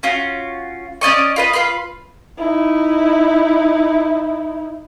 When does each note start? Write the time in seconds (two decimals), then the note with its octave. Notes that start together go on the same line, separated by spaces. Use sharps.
0.03 C#4 F4 F#4
1.01 C#4 D5 D#5 C#6
1.36 F4 B4 D#5
1.53 F4 B4 B5 C6
2.38 D#4 E4